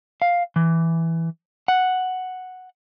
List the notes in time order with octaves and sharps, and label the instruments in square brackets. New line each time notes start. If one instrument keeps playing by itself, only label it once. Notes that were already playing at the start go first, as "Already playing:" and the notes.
[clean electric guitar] F5
E3
F#5